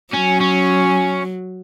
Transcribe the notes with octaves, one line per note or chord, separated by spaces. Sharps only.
F#3 C#4
C#4